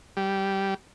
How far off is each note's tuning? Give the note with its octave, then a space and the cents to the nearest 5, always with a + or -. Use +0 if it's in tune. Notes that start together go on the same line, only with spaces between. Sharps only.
G3 -10